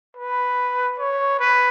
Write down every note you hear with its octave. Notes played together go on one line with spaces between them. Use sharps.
B4
C#5
B4